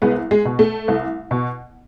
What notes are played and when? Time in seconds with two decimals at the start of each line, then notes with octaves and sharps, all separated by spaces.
0.02 C2 G#3 B3
0.31 G#3
0.45 B2
0.59 A3
0.88 C2
1.31 B2